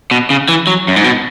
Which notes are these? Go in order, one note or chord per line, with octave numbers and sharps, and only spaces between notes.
B2
C#3
E3
F#3
F#2
G#2
B2